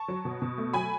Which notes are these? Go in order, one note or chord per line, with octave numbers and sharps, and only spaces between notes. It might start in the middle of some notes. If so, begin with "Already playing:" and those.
Already playing: A5 C#6
F#3
B2
B2
A3
F#3 G#5 B5